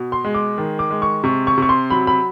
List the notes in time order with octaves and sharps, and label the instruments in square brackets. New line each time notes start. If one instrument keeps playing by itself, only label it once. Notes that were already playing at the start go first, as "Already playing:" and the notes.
Already playing: [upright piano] B2
C6
G#3
D6
D#3
D6
G#3
C#6
C3 C#6
C#6
C3 C#6
C6
F#3 B5
B5